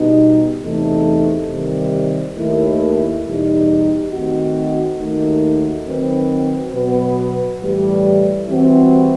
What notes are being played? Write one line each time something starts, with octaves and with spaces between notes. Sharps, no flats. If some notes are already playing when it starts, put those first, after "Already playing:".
Already playing: B2 G3 D#4
E2 C3 E3 A3 D#4
C3 D#3 G3
D#2 D#3 A3 E4
E2 B2 G3 D#4
D#3 A3 C4 D#4 F#4
D#2 D#3 A3 D#4 F#4
D#3 F#3 C4 F#4 B4
B2 F#3 B3 F#4 B4
A2 E3 G3
E3 G3 C4 F#4